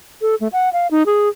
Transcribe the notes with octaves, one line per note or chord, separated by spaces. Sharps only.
A4
A3
F#5
F5
D#4
G#4